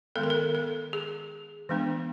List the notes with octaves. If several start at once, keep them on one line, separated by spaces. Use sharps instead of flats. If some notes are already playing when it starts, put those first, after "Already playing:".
D#3 G#3 B3 A4
A#4
A4
A4
G#4
E3 G#3 B3 D4